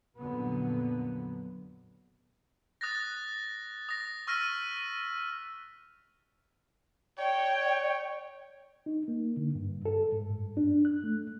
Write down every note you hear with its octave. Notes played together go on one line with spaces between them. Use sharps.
F2 A#2 D3 F#3 B3
D#6 F#6 A6 A#6
D#6 A#6
C#6 E6 F6 A#6 B6 D#7
C#5 D5 G5
D#4
A#3
D3
G2
A4
G#2
G2
D4
F#6
A3